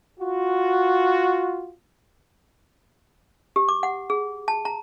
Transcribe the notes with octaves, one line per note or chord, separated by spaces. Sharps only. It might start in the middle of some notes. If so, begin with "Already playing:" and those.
F4 F#4
G4
D6
F#5
G#4
A5
A#5